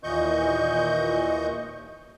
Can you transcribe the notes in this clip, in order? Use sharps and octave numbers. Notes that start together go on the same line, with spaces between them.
D#2 A#2 E3 D#5 C#6 G6